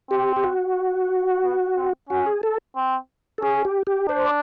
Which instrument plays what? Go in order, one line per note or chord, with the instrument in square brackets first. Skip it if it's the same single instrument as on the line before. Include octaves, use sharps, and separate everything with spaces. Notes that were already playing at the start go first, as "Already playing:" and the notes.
[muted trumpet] C4 [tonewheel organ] G4
[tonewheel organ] G4
F#4
[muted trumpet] B3
C4
[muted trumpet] C#4 [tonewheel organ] F#4
[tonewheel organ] G#4
A4
[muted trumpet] C4
[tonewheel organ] A4
[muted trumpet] C#4 [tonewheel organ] G#4
[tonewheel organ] G4
G4
[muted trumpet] D4 [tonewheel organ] C5
[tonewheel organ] D5